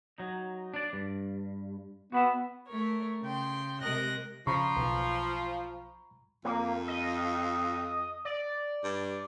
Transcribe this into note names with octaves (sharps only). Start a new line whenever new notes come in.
F#3 D#4
D4 D5
G2
B3 F#4 B4 E5
A3 A#4 C#5
C#3 G5 C6
C3 G#3 A#4 D#5 F#6 A#6
C#3 F3 A#5 B5 C#6
B1
F2 A#3
D#5
D5
G2